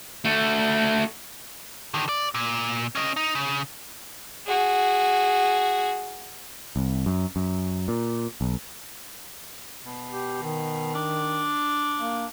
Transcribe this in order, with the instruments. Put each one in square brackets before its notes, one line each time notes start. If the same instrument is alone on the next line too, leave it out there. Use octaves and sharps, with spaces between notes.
[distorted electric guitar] A3 F#4
[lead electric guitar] D3 D#3
D5
A#2
C#4 D#5
D#4
C#3
[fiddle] F#4 G#4
[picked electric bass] C2
F#2
F#2
A#2
B1
[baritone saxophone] B2
[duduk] G4
D#3
[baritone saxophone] D4
[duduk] A#3